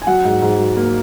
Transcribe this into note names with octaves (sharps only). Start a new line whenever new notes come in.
G#5
F#3 F#5
G#2
G#2
F#3
A#3